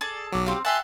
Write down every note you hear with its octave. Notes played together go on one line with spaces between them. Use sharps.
G#4 A4 D5
A5
B1 F#3 D6
C4 G4 F5
G4 E5 F#5 G#5 A5 C6